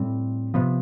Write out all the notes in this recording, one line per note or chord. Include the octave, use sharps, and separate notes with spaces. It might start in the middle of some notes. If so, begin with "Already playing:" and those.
Already playing: A2 G3 C4
C3 F3 B3